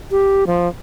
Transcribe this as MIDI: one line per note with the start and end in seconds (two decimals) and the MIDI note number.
0.11 0.47 67
0.47 0.68 53